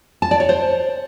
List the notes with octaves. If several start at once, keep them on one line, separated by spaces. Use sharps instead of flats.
A5
D5
C#5
C5